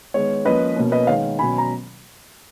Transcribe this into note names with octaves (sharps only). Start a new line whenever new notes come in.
D#3 G#3 B3 C#5
F3 A#3 C#4 B4 D#5
B2 A#3 C#4
B4 D#5
D#3 G#3 B3 C#5 F5
B2 F#3 C#4 G#5 B5
A#5